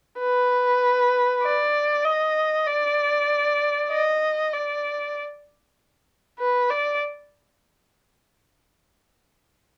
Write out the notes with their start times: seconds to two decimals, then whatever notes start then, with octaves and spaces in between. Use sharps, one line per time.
0.19 B4
1.43 D5
2.04 D#5
2.67 D5
3.91 D#5
4.53 D5
6.39 B4
6.70 D5